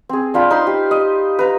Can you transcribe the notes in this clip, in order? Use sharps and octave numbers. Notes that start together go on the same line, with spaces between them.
C4 G#4
D4 F4 G5 B5
D#4 C5 B5 C6
G4
D#5
B4 A#5